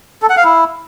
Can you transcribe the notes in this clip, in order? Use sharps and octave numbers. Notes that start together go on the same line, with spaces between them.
A4
F#5
F5
E4